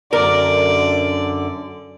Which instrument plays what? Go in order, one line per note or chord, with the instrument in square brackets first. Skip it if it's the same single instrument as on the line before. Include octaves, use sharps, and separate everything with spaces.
[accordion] F#2 D3 [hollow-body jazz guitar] A#4 [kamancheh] D5